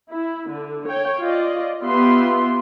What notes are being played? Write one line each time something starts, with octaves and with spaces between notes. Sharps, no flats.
E4
D3
C#5 G5
F4 D5 D#5
B3 F4 G4 E5 C6